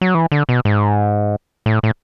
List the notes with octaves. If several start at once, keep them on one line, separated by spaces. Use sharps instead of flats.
F#3
E3
D3
B2
G#2
A2
A2